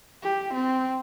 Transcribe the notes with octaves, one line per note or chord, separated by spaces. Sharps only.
G4
C4